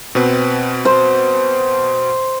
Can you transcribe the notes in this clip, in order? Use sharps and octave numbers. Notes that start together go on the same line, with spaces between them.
B2 C4 B4
C5